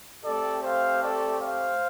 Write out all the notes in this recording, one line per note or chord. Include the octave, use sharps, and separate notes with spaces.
A3 C4 G4 A4 D5
C5 F5
A4 D5
C5 F5